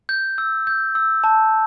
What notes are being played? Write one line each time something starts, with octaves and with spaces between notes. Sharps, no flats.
G6
E6
G6
E6
A5